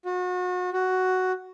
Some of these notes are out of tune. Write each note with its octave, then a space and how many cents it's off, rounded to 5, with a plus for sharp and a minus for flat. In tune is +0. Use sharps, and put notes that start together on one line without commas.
F#4 -35
F#4 +5